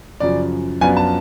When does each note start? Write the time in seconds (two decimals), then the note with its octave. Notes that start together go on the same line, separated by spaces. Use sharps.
0.20 F#2 C#3 F3 D5
0.81 F#2 F3 B3 D4 F4 G#5
0.97 A5